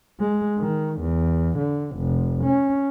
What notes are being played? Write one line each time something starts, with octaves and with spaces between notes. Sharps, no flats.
G#3
D#3
E2
D3
F1
C#4